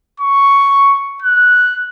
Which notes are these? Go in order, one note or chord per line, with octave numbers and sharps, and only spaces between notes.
C#6
F#6